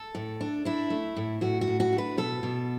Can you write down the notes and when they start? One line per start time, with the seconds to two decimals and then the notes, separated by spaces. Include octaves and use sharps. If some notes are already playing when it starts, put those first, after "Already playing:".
Already playing: A4
0.15 A2
0.41 D4
0.65 D4 E4
0.90 A3
1.16 A2
1.41 A2 F#4
1.61 F#4
1.68 A2
1.80 F#4
1.92 D4
1.98 B4
2.17 B2 A4
2.43 B2